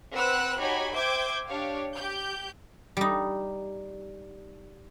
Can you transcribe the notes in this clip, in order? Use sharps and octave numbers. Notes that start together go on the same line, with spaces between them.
C4 B4 F#5 E6 F#6
D#4 F#4 G4 C#5 G#5 B5
C5 E5 G5 D6 G6 G#6
D4 G4 C#5 F5
G4 G6
G3 D#4